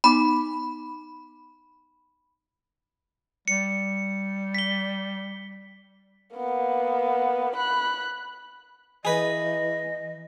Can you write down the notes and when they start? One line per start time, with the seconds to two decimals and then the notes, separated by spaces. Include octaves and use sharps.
0.04 B3 D#4 B5 D6
3.48 G3 C#7
4.55 B6 G7
6.36 A#3 B3
7.55 B5 F#6
9.05 E3 G#4 B4 D#5